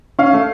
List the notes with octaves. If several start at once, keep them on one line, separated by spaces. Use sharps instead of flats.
C#4 F5
A3